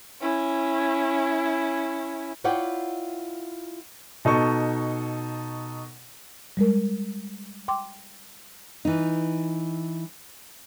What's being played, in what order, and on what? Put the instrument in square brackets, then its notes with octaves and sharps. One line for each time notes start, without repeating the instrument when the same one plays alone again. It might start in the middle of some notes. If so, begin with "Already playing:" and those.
[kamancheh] C#4 E4
[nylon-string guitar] E4 F4 C#5 D5 F#5 G5
[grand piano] B2 D#4 A4 C#6
[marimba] G3 G#3 A#4
G5 C6 D6
[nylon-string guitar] E3 D#4